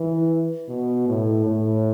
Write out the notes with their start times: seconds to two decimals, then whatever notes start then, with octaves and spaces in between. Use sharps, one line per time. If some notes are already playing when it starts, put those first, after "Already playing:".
Already playing: E3
0.69 B2
1.08 A2
1.46 A2